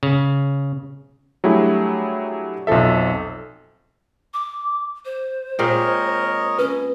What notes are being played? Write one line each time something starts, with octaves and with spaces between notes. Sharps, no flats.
C#3
F#3 G3 A3 D4 E4 G#4
B1 F2 F3 A4 E5
D6
C5
A#2 G#3 C4 A#4 C#5 D#5
C#4 B4